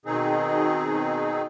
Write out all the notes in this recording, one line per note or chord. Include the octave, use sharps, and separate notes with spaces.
B2 D#3 C4 D#4 G#4